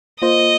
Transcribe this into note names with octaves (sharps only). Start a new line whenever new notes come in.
A#3 F4 C5 D#5